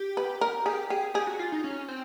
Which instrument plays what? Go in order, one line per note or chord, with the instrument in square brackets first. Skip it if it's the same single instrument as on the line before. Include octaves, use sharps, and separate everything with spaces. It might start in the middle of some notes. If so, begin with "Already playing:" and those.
Already playing: [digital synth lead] G4
[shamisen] B4
A#4
[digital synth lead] G4 [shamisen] G#4
[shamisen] G4 [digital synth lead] G#4
[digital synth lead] G4 [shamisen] G#4
[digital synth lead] F#4
F4
D#4
C#4
C4